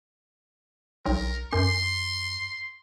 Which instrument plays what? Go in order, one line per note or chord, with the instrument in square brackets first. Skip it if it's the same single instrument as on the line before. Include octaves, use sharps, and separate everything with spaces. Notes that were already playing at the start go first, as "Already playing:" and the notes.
[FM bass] B1 [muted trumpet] A#4
[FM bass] F#2 [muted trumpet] C6